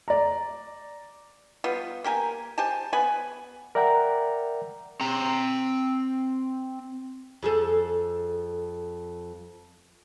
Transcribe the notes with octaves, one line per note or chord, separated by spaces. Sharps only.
D5 A#5
G3 B3 F4
A#3 G4 A#4 G#5
G4 C5 G#5 A5
B3 G#5 B5
A#4 D5 E5 F#5 G5 A#5
C4 A#5
F2 G#4 A4